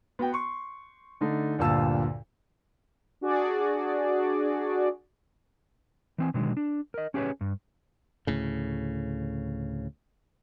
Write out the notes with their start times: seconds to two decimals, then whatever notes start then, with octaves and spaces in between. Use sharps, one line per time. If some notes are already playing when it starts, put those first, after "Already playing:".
0.19 B3 F#4 G5
0.33 C6 C#6
1.21 D3 A3 D#4
1.58 D2 G2 A#2 F4 A5 E6
3.21 D4 F#4 G#4 D5
6.18 E3 C4 G#5
6.34 B2 D3 D#3 F#3 G#3
6.57 D4
6.94 A#4 D#5
7.14 C#4 G4 G#4 A#4 B4 C#5
7.41 G2
8.27 D2 A2 C#3